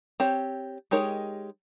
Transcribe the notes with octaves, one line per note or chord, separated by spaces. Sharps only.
C4 G4 C#5
G#3 D#4 G4 A#4 C#5